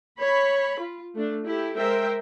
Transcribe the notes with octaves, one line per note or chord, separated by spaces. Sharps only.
C#5 B5
F4
A3 D4
E4 G4 A4
G#3 A#4 C5 E5 G5